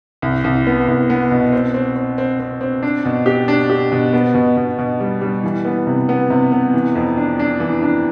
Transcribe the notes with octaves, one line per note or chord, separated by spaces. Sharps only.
C2
C2
B3
C2
B3
B2
C4
C4
C4
C4
C4
C4
D4
B2
G4
D4
G4
B2
B3
B2
B2
B2
G3
G3
E3
B3
C3
B3
C3
B3
E3
F2
D4
D4
E3
D4